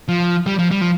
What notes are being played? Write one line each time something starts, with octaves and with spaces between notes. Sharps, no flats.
F3
G3
F3
G3
F3